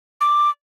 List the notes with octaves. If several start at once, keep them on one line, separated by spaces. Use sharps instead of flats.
D6